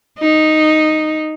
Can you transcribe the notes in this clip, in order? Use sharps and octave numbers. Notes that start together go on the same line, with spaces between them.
D#4